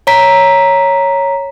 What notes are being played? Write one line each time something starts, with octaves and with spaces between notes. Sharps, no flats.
C#5 A#5 B6